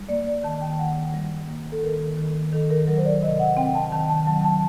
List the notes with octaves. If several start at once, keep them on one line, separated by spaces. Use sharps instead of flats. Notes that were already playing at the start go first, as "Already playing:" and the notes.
Already playing: G3
A#3 D5
D5
D#3 A5
G5
D#3 F#5
G3
A#3
A4
D#3 A#4
D#3
D#3 A4
A#4
F#3 A#4
C5
D5
C3 D#5
F#5
C4 G5
A5
D#3 A5
A5
F#3 A5
A5